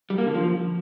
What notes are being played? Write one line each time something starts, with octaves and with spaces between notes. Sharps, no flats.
G3
A#3
D3
F3